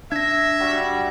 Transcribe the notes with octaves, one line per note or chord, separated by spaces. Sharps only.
D4 E5 G#6 A#6
G3 F#4